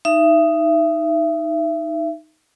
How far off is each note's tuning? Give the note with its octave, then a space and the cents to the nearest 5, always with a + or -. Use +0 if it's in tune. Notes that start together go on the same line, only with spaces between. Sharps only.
D#4 +0 E5 +30